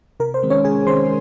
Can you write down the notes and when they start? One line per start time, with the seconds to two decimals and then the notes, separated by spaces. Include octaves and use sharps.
0.20 C3 A#4
0.34 C5
0.43 D#3 G#3 C4
0.50 C#4 C#5
0.65 C3 G#4 G#5
0.87 D#3 G#3 C4 C5 C6